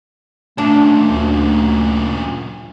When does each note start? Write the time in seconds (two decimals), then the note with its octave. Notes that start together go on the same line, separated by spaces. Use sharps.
0.58 F#2 A#2 A3 D4
1.10 D2